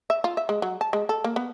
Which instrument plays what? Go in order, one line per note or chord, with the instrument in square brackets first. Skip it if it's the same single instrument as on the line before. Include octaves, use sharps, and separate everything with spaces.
[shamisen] E5
F4
E5
G#3
F#3
A5
G#3
A4
A#3
B3